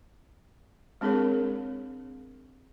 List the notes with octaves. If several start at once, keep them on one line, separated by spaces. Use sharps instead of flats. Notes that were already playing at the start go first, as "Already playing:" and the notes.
G#3 C4 D4 G#4 A#4 C#5